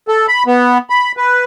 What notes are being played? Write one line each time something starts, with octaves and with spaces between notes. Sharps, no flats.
A4
B5
B3
B5
B4